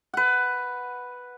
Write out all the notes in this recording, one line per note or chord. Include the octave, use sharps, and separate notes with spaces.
B4 F#5